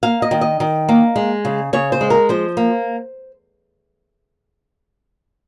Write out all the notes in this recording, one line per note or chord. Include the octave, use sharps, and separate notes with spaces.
A#3 F5
D#5
D#3
D#5
D#3
A#3
G#3
C#3
C#3 C#5
C5
G#3
A#4
F3 C5
A#3